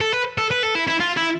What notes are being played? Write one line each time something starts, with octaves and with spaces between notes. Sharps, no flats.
A4
B4
A4
B4
A4
E4
E4
F4
E4